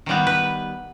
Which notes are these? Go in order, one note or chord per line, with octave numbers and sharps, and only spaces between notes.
D#3 G3 B3
B4